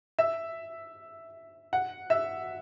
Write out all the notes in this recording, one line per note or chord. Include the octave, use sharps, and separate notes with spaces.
E5
F#5
E5